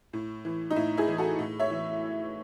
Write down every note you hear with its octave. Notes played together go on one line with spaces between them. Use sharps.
A2
E3
D#4
A2 E4
E4 G#4
E3
F#4 A4
A2
C#5 E5
E3